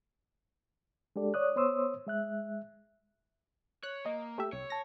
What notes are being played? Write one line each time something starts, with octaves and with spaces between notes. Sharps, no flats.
G#3 D4 G4 A4 D5
C#5 D5 D#6 F#6
B3 C5 C#5 C6 D#6 E6
G#3 E5 F#6
C#5 F#6
A#3 D#5
A3 G4 E5
C2 C#5
A5 A#6